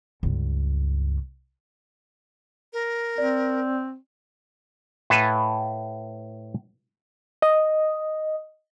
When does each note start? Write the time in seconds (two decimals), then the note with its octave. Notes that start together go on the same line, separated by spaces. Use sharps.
0.23 C#2 G2
2.73 A#4
3.18 C4 D5
5.10 A2 A4 B4 F5 G#5 A5
7.42 D#5